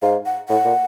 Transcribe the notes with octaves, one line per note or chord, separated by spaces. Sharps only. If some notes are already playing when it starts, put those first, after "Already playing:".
G#2 F5
F#5
A2 F#5
A#2